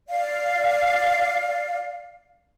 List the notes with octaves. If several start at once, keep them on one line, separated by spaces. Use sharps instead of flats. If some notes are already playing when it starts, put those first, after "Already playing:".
D5 F5